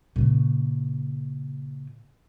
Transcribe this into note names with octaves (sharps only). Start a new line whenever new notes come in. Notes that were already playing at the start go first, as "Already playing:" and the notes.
A#2 C#3